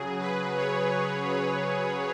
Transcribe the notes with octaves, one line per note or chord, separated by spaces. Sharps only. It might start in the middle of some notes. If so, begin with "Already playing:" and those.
Already playing: C#3 F#3 G#4
B4
C#5
B4